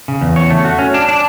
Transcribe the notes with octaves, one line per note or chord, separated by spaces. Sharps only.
C#3
E2
C#5
A3
F#4
C#4
D4
D4